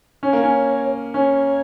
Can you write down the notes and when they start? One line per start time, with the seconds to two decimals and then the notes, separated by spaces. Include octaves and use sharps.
0.23 C#4 C#5
0.33 A#3
0.43 C#4
1.14 C#4 C#5